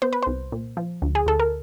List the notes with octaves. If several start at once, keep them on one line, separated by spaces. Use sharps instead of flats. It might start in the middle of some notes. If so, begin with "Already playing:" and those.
B3 C5
B4
C2 C5
A#2
F3
D2
G#4
D2 A4
A#4